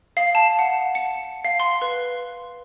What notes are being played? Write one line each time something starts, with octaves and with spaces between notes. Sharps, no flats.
F5
A5
F#5
C#7
F5
C6
B4